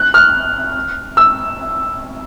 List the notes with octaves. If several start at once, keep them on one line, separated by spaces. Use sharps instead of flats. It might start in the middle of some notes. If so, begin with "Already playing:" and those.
Already playing: F#6
F6
E6